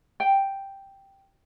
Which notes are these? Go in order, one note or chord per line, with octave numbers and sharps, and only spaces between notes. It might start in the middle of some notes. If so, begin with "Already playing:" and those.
G5